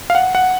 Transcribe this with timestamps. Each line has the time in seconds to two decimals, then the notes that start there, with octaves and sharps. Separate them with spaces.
0.10 F5
0.15 F#5
0.35 F#5